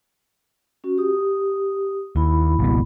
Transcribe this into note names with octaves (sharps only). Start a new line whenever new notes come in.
C#4 F#4
G4 D#6
D#2 E4 B5
G#1 C#2 B2